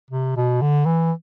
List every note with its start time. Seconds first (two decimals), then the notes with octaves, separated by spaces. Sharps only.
0.11 C3
0.36 B2
0.62 D3
0.86 E3